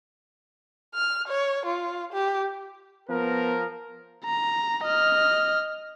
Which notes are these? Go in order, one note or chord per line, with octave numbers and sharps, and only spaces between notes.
F6
C#5
F4
G4
F3 B3 A#4
A#5
D#5 F6